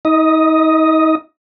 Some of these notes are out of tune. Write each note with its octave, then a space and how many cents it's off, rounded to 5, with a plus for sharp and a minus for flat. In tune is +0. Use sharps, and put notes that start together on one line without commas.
D#4 +40 D#5 +0